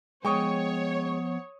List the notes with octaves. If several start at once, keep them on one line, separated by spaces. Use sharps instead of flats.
F3 G#3 B3 C#5 G5 C#6 D#6